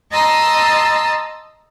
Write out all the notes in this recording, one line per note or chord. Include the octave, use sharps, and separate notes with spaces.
D#5 A5 A#5 C6 D#6 E6